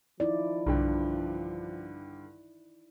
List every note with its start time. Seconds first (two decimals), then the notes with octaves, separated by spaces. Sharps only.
0.20 F3 D#4 E4 D5
0.66 B1 G2 D3 G5